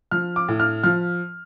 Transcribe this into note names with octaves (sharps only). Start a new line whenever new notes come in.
F3 F6
D6
A2
F6
F3 F6